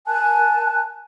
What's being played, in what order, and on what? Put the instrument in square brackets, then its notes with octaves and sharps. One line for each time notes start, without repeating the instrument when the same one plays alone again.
[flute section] A#4 G#5 A5 F#6